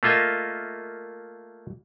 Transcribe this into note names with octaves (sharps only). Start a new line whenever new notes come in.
A3 A#3 F4 D#5 E5